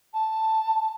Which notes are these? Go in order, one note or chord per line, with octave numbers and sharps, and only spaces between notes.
A5